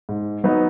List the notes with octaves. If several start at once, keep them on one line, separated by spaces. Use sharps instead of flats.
G#2
F#3 B3 D#4